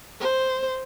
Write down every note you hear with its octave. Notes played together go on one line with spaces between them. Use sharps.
C5